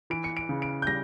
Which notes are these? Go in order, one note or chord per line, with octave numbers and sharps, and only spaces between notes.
E3 D7
C#7
D7
C#3
D7
G6
G3 A#6